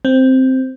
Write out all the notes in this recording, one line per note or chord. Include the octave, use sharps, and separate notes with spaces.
C4